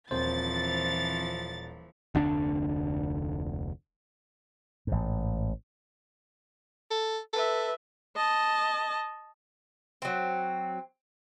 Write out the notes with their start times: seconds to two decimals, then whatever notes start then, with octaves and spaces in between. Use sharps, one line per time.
0.11 D#1 E3 F3 C4 C5 A6
2.15 F1 D2 D3 D4
4.87 A1 G#2
6.91 A4
7.33 A4 B4 E5
8.16 D#5 A5
10.02 F#3 C4